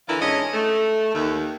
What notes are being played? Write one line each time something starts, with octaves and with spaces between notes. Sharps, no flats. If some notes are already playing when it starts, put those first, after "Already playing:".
D3 E3 E4 F4 A#4
G#2 C#4 D4 D#5
A3
D#2